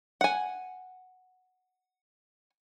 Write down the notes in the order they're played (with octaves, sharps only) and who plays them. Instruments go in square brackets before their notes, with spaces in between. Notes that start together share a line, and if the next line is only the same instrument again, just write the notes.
[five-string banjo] F#5 G#5